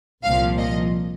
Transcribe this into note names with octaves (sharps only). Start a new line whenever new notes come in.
C2 A#2 F3 F5
D#5